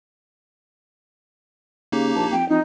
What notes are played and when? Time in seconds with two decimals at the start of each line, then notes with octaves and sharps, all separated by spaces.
1.92 C#3 A#3 D#4 G4
2.15 A#1 A5
2.32 F2 G5
2.49 F2 D#4